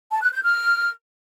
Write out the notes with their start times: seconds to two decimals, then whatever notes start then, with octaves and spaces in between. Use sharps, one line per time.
0.12 A5
0.22 F#6
0.32 G6
0.43 F6